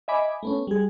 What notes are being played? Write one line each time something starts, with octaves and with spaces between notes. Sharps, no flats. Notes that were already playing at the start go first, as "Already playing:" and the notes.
D#5 E5 G#5 B5 D6
A3 B3 C#4
G3 G#4